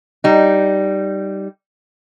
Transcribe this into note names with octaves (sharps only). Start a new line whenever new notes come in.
G3 D#4